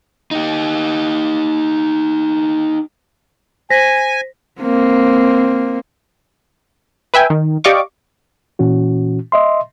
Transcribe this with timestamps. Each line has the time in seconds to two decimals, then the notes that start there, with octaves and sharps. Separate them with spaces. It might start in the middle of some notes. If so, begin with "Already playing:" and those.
0.31 D#4 G4
3.70 C5 G#5 A#6 B6
4.61 A#3 C4
7.14 B4 E5 G5 G#5
7.30 D#3
7.64 G4 D5 D#5 F5 C#6 D6
8.59 A#2 E3 C#4 F#4
9.32 D#5 E5 C6